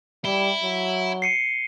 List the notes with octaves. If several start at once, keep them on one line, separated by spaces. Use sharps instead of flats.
G3 E4 G7
F#3
C7 C#7 D#7